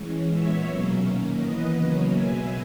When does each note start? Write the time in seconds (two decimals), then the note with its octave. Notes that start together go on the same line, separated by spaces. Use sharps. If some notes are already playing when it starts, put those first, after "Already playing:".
Already playing: E3 G#3 C#4
0.29 A#2 G#3 B3 C#5 E5
0.65 B2 F#3 A#3 C#4
1.02 D#3 A#3 C#4
1.39 E3 B3 B4 D#5
1.75 C#3 F#3 A#3 C#4
2.11 B2 G#3 B3 E5 G#5